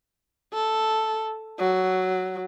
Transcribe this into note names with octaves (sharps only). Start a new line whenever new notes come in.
A4
F#3